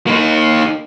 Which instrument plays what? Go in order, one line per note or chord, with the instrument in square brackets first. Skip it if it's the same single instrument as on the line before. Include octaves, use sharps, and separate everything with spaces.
[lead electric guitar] A#3 D#4